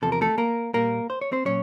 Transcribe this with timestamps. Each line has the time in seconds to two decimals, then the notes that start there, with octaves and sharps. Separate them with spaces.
0.02 E2 C3 F3 A4
0.12 A#4
0.21 A3 A4
0.38 A#3 A#4
0.74 A#2 G3 A#3 A#4
1.10 C5
1.21 C#5
1.32 C4 C5
1.45 A#2 F#3 C#4 C#5